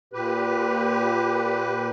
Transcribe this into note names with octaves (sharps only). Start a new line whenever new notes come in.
A#2 G4 B4